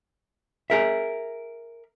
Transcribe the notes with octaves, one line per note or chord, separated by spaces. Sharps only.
G#4 A#4 E5